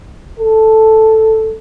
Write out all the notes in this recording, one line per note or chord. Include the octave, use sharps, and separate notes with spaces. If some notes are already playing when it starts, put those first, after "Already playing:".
A4